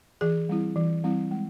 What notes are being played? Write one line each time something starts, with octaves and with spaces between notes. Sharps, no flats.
E3 G#4
G3 C4 E4
E3
G3 C4 E4
G#3